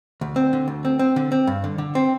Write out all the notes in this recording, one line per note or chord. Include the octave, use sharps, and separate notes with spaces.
D2
C4
D3
D2
C4
C4
D3
C4
G2
D3
D3
C4